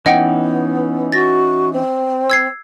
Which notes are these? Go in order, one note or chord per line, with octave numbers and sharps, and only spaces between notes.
E3 B3 C#4 D#4 D#5 F#5 G5
F#4 A6 A#6
C4
E6 G#6 C7